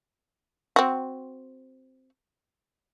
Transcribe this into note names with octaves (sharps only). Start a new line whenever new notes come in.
C4 F#4